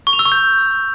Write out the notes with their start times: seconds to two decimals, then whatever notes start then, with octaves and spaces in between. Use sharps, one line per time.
0.07 C#6
0.13 F7
0.19 E6
0.25 C#6
0.32 G6